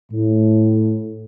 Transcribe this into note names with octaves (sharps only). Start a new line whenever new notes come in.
A2